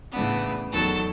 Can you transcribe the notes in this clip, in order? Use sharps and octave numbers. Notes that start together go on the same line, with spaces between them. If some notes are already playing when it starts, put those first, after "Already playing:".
A2 C#3 E3 B3 D4
E2 D#3 F#3 A4 A5